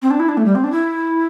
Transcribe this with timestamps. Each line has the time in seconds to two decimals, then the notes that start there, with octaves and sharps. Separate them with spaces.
0.02 C4
0.10 D4
0.20 E4
0.29 D4
0.37 A3
0.46 G3
0.55 C4
0.64 D4
0.72 E4